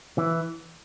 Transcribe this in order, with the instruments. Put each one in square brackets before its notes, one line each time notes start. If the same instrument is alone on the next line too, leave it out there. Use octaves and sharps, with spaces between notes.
[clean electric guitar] E3